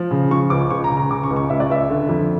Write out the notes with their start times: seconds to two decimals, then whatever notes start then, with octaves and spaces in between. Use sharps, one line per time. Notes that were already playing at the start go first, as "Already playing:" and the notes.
Already playing: F3
0.11 C#3
0.31 F3 C#6
0.50 C#2 D6
0.70 C#2 C#6
0.84 A#5
0.90 C#3
0.97 A#5
1.10 C#3 D6
1.23 C#6
1.31 C#2
1.36 C#6
1.50 C#2 E5
1.60 D5
1.70 C#2 E5
1.90 D3
2.09 F2